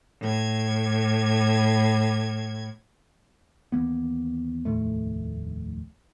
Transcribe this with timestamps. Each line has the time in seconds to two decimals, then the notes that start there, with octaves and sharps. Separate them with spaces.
0.21 A2 G#6
3.72 D#2 E3 A#3 B3
4.65 F1 D#2 A2 A3